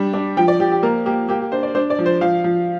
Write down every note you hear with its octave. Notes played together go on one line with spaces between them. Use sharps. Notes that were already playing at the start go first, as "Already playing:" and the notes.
Already playing: G3 D4
D4
F3 G5
D5
F3 G4
G4
A#3 A#4
A#3 G4
A#3 G4
G4
D4 C5
D5
D4 C5
D5
F3
C5
F3 F5
F3